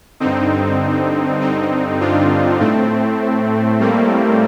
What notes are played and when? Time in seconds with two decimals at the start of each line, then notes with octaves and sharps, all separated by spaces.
0.20 G2 D3 C4 D#4
1.40 C4 D#4
2.01 D4 F4
2.60 A2 A3 C4
3.80 G3 A#3